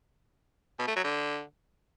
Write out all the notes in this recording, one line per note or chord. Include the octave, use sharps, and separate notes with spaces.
B2
A3
F#3
D3